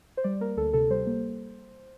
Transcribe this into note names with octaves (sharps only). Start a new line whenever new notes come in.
C5
G3 D5
A#3 A#4
D2 A4
C3 A4
G3 C5
A#3